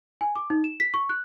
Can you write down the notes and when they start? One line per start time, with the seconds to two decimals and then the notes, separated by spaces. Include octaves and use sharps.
0.21 G#5
0.36 D6
0.50 D#4
0.64 E7
0.80 B6
0.94 C#6
1.09 F#6